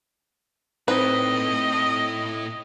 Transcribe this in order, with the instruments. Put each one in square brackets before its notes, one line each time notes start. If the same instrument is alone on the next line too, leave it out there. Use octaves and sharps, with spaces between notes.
[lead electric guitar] A2 A3 [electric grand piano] C4 D#4 C5 [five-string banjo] B4 [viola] D#5